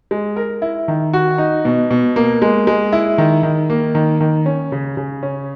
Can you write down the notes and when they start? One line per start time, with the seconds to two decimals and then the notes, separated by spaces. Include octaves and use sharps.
0.11 G#3
0.36 A#4
0.62 E4
0.88 D#3
1.13 F#4
1.38 D#4
1.65 B2
1.91 B2
2.16 A#3
2.42 G#3
2.67 G#3
2.93 E4
3.18 D#3
3.43 D#3
3.70 A#3
3.95 D#3
4.20 D#3
4.46 C#4
4.72 C#3
4.97 C#3
5.23 C#4